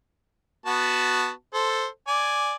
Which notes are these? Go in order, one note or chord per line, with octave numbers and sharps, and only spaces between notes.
B3 F#4 A5
A4 C5
D5 G#5